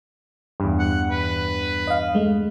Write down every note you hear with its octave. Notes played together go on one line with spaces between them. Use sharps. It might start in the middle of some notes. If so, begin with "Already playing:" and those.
E2 G2
F#5
B4
D#5 F5
G#3 A3